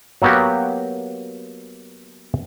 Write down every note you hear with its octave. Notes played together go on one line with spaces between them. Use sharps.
F#3 A#3 B3 F#4 G4